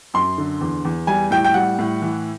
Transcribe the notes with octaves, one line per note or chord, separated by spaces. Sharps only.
F#2 C6
D3
E2
E2
G3 G#5
A2 G5
G5
G3 F#5
A2
E3